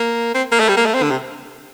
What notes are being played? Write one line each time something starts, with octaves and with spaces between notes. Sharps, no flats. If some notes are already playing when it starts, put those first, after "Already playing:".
Already playing: A#3
C4
A#3
A3
G3
A#3
A3
C4
D3
C3